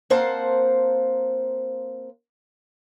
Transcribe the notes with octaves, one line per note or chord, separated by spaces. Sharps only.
A#3 C4 C5 F5 F#5 A5